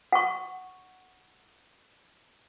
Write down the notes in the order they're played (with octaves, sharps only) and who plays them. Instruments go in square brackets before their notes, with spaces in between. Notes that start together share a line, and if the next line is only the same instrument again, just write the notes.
[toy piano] F#5 C#6